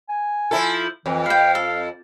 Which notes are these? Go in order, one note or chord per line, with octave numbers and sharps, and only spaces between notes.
G#5
F3 E4 A4
F2 E3
B4 F5 G5
A4